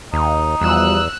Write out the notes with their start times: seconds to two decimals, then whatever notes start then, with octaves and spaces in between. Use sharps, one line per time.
0.13 D#2 D#4
0.61 E2 B2 F3 G3 E6 F#6